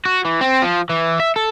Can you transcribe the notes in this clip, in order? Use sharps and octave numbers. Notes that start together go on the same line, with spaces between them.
F#4
E3
C4
F3
E3
E5
A4